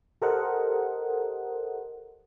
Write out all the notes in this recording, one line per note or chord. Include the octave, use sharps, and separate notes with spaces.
G4 A4 A#4 C5 D#5 F#5